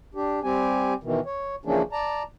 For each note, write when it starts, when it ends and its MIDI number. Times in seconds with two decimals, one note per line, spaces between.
0.15 0.40 62
0.15 0.40 67
0.43 0.94 55
0.43 0.94 60
0.43 0.94 67
0.43 0.94 80
1.04 1.20 47
1.04 1.20 51
1.04 1.20 52
1.26 1.55 73
1.65 1.82 49
1.65 1.82 52
1.65 1.82 53
1.65 1.82 58
1.65 1.82 61
1.65 1.82 62
1.92 2.23 74
1.92 2.23 81
1.92 2.23 82